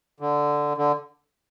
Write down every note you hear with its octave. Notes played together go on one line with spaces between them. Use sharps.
D3
D3